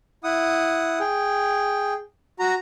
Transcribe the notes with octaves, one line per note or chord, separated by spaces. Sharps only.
E4 F#5 D#6
G#4 G5
F#4 A#5